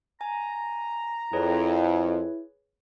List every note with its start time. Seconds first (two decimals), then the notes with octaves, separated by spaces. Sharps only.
0.21 G#5 A#5
1.33 F2 E4 G#4 B4 C#5